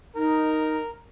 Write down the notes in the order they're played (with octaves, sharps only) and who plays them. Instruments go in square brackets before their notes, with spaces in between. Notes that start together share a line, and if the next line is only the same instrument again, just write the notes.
[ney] D#4 [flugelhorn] A#4